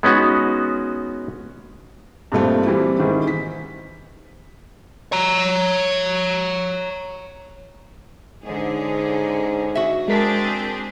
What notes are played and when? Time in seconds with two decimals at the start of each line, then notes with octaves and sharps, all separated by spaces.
0.03 G#3 B3 C#4 D#4 F#4
2.32 G2 A#2 A3 C4
2.66 E3 G3 C4
2.99 G#2 D#3 E3
3.27 B6
5.12 C#5 A#5
8.44 G#2 D3 C#4 G#4
9.75 F#4 E5
10.08 G#3 C4 D4 G#4 A#4 B6